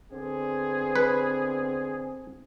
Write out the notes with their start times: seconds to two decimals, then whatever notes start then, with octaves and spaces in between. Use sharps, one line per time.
0.12 D3 B3 C4 G#4
0.96 B4